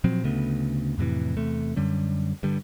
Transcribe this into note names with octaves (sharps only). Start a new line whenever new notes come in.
A#2 F3 F#3 C4
D2 C#3 A3 B3
F2 A2 C3 E3
E2 C3 A3
F#2 D3 G3 C#4
G2 D3 G3